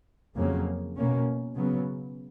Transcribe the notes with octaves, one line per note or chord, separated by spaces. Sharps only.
F2 C#3 F#3 A#3
B2 A#3 C#4
C#3 F#3 B3